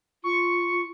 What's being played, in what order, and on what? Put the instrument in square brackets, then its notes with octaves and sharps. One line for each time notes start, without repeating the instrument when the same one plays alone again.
[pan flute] F4 [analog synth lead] C#6